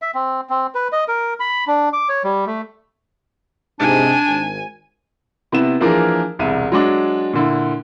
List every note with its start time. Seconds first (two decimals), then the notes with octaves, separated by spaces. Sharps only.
0.02 E5
0.15 C4
0.50 C4
0.75 B4
0.92 D#5
1.08 A#4
1.40 B5
1.67 D4
1.93 D6
2.09 C#5
2.24 G3
2.47 A3
3.80 G#2 C3 D4 G#5
4.27 G#1
5.52 C3 B3 E4 E7
5.80 E3 F3 A#3 D4 G#4 A#4
6.39 E1 C2 E5 D#7
6.72 F#3 G#3 D4
7.33 A#2 D3 E4